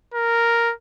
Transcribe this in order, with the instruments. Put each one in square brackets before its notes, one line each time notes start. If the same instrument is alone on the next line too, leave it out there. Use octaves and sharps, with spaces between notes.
[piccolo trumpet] A#4